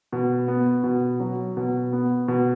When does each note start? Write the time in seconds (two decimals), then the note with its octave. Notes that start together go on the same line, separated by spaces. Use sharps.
0.13 B2
0.48 B3
0.84 B2
1.20 F#3
1.57 B2
1.93 B3
2.28 B2